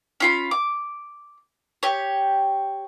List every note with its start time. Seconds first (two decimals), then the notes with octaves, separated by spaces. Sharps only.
0.20 C#4 F4 B5
0.51 D6
1.83 G4 C#5